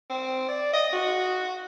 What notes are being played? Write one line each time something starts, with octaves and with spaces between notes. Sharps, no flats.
C4
D5
D#5
F#4